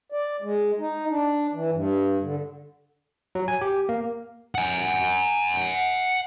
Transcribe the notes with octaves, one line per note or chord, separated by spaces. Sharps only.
D5
G#3
D#4
D4
E3
G2
D3
F#3
G#5
G4
A#3
F#5 G#5